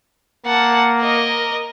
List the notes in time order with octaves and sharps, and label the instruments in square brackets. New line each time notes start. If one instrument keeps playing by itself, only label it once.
[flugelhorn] A#3 [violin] F#5 A5
[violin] A#4 D#5